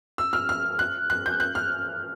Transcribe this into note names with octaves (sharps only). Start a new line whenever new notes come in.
E6
F6
F6
F#6
F#6
G6
F#6
F6